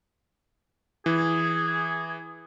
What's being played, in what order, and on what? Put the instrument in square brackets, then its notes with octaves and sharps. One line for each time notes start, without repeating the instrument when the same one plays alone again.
[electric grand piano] E3 [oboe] G#4